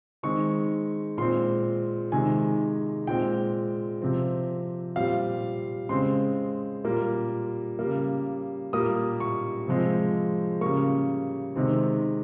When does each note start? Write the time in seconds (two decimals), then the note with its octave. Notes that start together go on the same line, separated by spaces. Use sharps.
0.23 D#3 G#3 C4 C#6
1.18 A#2 G#3 C4 C6
2.12 C3 D#3 G#3 G#5
3.07 A#2 G#3 C4 G5
4.02 C3 F3 C4
4.96 A#2 G3 C4 F5
5.89 C#3 G#3 C4 C6
6.84 A#2 G3 A#3
7.79 C#3 G3 A#3
8.73 A#2 G3 A#3 D#6
9.20 C#6
9.67 C3 F3 G#3 C4
10.61 C#3 G3 A#3 C#6
11.56 C3 D#3 G#3 C4